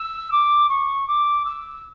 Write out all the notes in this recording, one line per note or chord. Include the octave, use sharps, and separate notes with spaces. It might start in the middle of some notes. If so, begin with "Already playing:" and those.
Already playing: E6
D6
C#6
D6
E6